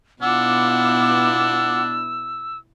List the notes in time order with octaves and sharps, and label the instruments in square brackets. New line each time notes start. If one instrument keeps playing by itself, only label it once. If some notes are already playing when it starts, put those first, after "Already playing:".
[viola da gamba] B2 B3 E4 [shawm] D4 [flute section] F4 F#5 D6 [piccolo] E6